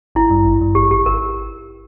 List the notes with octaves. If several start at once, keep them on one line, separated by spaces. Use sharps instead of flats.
G#1 E4
G2
G#1
G2
G#1 G4
G#1 G4
G#1 A#4